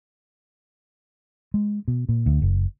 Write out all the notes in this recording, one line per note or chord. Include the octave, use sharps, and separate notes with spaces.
G#3
B2
A#2
D2
F#1